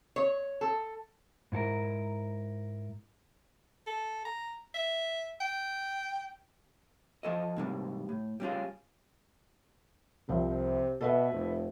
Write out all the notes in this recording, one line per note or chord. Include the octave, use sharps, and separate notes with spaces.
C#5
A4
G#2 E4 A4 A#4
A4
A#5
E5
G5
F3 A4 D#5
G#2 C3 G3
A2
G3 C#4 F4 G#4
C2 C3 F3 C4
B2 A4 B4 E5
F1